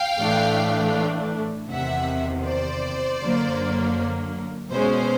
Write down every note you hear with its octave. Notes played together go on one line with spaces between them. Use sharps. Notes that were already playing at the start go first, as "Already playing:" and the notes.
Already playing: F5 G5
A2 E3 A3 D4
E2 C3 D#3 E5 F#5
C5 D5
F#2 D3 F#3 A#3
B2 G#3 C#4 C5